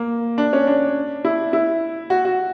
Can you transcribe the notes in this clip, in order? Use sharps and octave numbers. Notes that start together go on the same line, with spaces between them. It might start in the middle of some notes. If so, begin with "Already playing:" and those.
Already playing: A#3
D4
C#4
D4
E4
E4
F#4
F#4